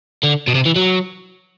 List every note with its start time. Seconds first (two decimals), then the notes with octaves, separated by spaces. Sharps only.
0.23 D3
0.48 B2
0.55 C3
0.66 E3
0.76 F#3